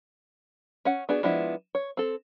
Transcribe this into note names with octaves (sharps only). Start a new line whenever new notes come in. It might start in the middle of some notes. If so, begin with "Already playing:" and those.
C#4 F#5
B3 D4 F#4 G#4
F3 G#3 B3 D4 E4
C#5
C4 A4